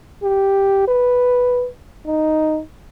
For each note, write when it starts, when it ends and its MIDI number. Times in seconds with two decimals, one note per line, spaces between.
0.23 0.85 67
0.88 1.68 71
2.07 2.61 63